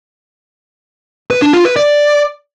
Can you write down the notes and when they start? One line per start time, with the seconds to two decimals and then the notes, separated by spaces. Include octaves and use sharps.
1.30 B4
1.42 D4
1.53 F4
1.65 B4
1.76 D5